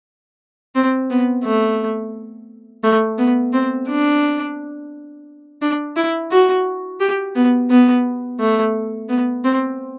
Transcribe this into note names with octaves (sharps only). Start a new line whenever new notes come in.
C4
B3
A3
A3
B3
C4
D4
D4
E4
F#4
G4
B3
B3
A3
B3
C4